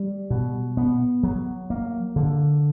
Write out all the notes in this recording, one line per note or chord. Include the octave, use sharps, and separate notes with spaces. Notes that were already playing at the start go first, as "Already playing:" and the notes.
Already playing: G3
B2
B3
F#3
A#3
D3